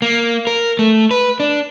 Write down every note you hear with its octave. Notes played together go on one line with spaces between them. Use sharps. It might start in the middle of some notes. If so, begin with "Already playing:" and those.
A#3
A#4
A3
B4
D4